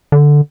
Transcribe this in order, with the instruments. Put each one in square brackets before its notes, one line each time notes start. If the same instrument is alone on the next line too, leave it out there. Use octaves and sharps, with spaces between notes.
[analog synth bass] D3